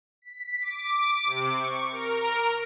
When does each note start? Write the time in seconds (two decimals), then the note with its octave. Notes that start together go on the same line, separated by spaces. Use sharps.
0.22 B6
0.61 D6
1.24 C3
1.55 C#6
1.91 A#4